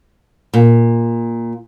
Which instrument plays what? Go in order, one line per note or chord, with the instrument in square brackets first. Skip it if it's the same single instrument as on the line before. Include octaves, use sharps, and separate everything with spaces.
[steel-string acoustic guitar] A#2